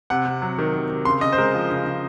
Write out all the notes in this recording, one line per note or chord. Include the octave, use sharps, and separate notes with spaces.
C3 F#5
C3
F#3
D#3
C3
C3
C#3 C6
C#3 D#5
C5
G#3 A#4
F3
C#3
C#3